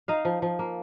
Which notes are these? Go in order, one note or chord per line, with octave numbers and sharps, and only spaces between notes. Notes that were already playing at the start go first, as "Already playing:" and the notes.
D#4 D#5 F5
F3
F3
A#3